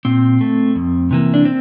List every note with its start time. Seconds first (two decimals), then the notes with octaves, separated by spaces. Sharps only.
0.05 A#2 C4
0.41 A3
0.75 F2
1.11 C3 E3 A#3
1.34 D4
1.45 C4